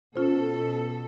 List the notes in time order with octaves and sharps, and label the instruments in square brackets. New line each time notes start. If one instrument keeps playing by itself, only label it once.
[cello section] B2 A4 [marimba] C#4 F4 C5